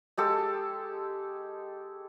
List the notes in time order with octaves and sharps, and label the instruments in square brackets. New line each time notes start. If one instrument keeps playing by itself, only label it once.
[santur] G#3 G4 A4